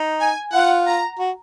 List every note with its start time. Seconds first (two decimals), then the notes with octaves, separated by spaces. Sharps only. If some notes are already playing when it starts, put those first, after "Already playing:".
Already playing: D#4
0.20 G#5
0.53 F4 F#5
0.87 A#5
1.19 F#4